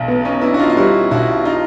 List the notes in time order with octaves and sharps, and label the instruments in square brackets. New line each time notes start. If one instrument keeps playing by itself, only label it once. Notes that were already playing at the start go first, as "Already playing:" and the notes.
Already playing: [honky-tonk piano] B1
B3
[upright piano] C#4 D#4
[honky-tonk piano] B3 [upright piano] D4 E4
[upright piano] F#4
D#4 F4
F4
[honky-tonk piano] G3 [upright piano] E4 F#4
[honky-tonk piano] B1 [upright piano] E4 F#4
[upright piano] D#4 F4